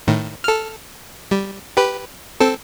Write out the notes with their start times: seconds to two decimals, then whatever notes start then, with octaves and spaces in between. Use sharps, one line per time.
0.07 A2 D#3
0.44 A4 F6
1.31 G3
1.77 G4 B4
2.40 C4 A4